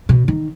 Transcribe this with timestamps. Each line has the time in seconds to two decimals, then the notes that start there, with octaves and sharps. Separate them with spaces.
0.09 B2
0.28 D#3